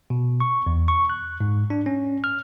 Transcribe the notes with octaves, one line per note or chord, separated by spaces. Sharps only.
B2
C#6
E2
C#6
F#6
G#2
D4
C#4
F6